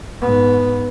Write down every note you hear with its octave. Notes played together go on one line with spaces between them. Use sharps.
G#2 B3